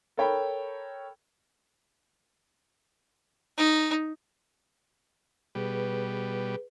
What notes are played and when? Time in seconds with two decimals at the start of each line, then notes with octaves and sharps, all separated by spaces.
0.17 A4 A#4 C#5 G5 B5
3.58 D#4
5.55 B2 G3 G#4 B4